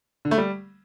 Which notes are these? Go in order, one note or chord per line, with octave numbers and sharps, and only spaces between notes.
D3
A3
G3